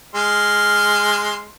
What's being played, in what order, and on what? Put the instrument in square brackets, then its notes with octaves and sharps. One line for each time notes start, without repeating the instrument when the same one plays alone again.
[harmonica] G#3 C6 F6